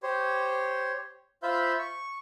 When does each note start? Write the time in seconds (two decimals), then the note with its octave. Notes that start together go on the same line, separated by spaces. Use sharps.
0.03 G4 C5 C#5
1.43 F4 C5 E5 F5 B5 G6
1.79 C#6